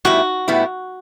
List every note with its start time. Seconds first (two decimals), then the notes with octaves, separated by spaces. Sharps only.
0.05 A2 G3 B3 E4 F#4
0.48 A2 G3 B3 E4